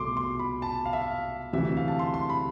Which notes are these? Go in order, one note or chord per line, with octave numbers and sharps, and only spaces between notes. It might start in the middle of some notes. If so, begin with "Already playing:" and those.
Already playing: C2 B2 A3 C6 D6
C6
B5
A5
F5
E5
F5
D2 C3 E3 G3 E5
E5
F5
A5
C6
C6
B5